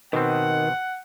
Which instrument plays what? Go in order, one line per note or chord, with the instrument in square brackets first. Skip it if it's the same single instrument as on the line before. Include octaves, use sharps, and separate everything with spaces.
[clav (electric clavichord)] B2 C4 [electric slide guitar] D#3 [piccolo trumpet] F#5